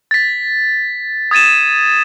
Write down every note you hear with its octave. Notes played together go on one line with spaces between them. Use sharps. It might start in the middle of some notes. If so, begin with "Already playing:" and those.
A6 B6
D#6 G#6 A6 D#7 E7